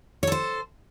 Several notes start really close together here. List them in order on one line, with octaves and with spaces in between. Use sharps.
C#5 A4 C5